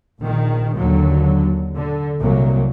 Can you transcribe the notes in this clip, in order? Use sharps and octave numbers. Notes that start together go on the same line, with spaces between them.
A#1 D#3
D#2 D3 F#3
D3
C2 F#3 A#3